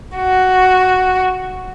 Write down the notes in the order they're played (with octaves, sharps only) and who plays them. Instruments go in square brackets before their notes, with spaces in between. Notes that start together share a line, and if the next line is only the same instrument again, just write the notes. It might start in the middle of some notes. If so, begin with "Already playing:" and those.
[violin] F#4